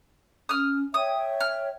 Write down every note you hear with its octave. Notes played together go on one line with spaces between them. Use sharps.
C#4 D#6 F6
C#5 E5 G5 D#6
F6